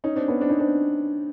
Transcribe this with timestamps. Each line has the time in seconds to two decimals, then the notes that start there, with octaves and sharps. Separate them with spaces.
0.04 C#4 D#4
0.16 C4 D4
0.28 B3 C#4
0.41 C4 D4
0.49 C#4 D#4
0.59 C4 D4